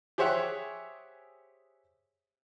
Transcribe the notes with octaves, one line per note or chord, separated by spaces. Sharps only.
G4 G#4 C5 C#5 E5 F#5